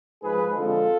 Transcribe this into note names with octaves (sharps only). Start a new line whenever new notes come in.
G#2 F3 G#3 G#4 B4
F2 D3 F3 G#3 F4 A4